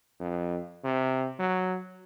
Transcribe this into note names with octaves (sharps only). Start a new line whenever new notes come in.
F2
C3
F#3